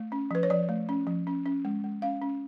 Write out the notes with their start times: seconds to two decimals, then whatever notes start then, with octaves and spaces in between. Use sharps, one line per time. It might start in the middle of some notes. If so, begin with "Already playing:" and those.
Already playing: A3
0.12 C#4
0.31 F3 B4
0.43 C#5
0.50 F3 D5
0.69 A3
0.89 C#4
1.07 F3
1.27 C#4
1.46 C#4
1.65 G#3
1.84 G#3
2.02 C#4 F5
2.22 C#4